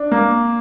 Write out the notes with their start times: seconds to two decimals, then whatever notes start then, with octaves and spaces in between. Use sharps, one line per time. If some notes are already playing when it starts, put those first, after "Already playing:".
Already playing: D4
0.12 A#3